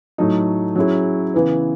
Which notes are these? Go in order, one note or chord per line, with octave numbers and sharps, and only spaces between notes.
A2 F#3 A3 D#4
F#3 C#4 E4 G#4
C#3 E3 B3